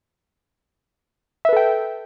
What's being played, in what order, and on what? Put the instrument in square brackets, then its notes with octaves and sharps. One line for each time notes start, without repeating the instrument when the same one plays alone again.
[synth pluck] E5
B4
A4
G5